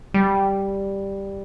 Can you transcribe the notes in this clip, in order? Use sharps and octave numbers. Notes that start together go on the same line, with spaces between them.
G3